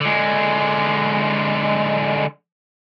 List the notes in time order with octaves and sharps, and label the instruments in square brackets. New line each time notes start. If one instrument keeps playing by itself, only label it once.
[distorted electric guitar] D3 G#3